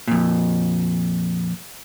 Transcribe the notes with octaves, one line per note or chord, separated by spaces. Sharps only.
F2 A#2